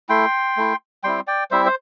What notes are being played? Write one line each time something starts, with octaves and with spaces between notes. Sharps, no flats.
A3 E4 G5 C6
A3 E4
G3 C4 E4 G5 C6
D5 G5
G3 C4 E4 C5 E5
C5